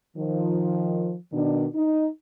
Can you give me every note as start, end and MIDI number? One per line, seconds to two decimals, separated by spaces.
0.17 1.15 51
0.17 1.15 53
1.33 1.66 47
1.33 1.66 51
1.33 1.66 62
1.75 2.07 63